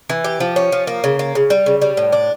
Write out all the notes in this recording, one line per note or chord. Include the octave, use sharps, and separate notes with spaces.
E3
G4
F3
C#4
F3
A#3
C#3
A#3
C#3
G3
C#3
G3
A2
D4